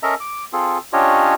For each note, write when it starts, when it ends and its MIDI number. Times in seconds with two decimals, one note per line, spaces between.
0.03 0.15 61
0.03 0.15 69
0.03 0.15 70
0.03 0.15 75
0.03 0.15 76
0.03 0.15 82
0.20 0.44 86
0.53 0.78 60
0.53 0.78 65
0.53 0.78 68
0.53 0.78 69
0.93 1.34 61
0.93 1.34 62
0.93 1.34 65
0.93 1.34 67
0.93 1.34 73
0.93 1.34 75